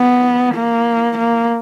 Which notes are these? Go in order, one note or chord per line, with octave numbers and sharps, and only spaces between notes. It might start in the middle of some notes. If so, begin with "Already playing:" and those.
Already playing: B3
A#3
A#3